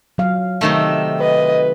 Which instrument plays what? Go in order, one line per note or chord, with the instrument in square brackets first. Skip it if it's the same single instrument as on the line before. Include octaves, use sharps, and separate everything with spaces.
[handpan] F#3 F5
[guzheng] C3 D#3 A3 [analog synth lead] E6
[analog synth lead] B4 [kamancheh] D#5